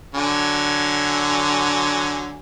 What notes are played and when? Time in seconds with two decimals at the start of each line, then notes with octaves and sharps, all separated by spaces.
0.15 D3 F#3 G#5